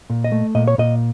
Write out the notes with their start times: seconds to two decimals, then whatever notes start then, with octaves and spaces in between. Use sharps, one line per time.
0.10 A#2
0.24 D#5
0.32 A3
0.55 A#2 D#5
0.68 C#5
0.78 A#2 D#5